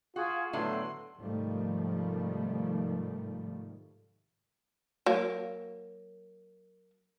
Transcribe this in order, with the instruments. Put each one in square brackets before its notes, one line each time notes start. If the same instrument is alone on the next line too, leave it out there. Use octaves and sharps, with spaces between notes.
[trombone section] F4 [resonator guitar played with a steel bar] F#4 [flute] G#4
[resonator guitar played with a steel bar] A2 D3 E4 [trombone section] F#3 A3 B3 [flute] C6
[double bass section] G#2 C3 D#3 F3 G3 A3
[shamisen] F#3 A#3